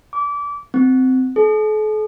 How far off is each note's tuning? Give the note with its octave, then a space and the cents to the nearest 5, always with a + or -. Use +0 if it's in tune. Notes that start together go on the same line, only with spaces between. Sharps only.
D6 -25
C4 -20
A4 -45